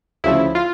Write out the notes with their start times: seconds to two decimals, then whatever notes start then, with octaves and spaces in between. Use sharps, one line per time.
0.24 D2 C#3 F3 E4
0.55 F4